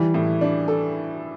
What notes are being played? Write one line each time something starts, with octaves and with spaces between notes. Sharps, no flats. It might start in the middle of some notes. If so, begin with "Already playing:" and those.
Already playing: E3 G3
A2
D4
A4